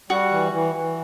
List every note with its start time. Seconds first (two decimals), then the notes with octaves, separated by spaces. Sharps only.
0.10 G3 F#4
0.32 E3
0.53 E3
0.75 E3